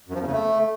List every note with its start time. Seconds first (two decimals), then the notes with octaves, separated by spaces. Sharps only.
0.08 F#2
0.14 F3
0.20 E2
0.26 C#3
0.32 A3